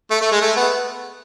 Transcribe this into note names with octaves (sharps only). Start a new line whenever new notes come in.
A3
A3
G#3
A3
B3